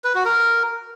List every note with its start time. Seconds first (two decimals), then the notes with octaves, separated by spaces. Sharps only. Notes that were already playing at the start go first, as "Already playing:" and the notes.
0.04 B4
0.15 F#4
0.25 A#4